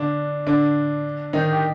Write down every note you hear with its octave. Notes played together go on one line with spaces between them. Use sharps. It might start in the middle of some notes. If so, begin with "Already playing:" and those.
Already playing: D3 D4
D3 D4
D#3 D#4
G4